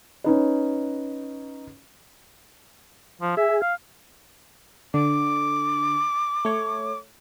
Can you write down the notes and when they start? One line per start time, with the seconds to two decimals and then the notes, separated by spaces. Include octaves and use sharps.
0.24 C#4 D#4 B4
3.21 F3
3.37 G#4 E5
3.61 F5
4.94 D3 D6
6.45 A3 C#5